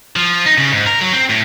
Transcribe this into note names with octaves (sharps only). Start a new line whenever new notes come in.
F3
D#4
C#3
G#2
A#4
F#3
C4
A2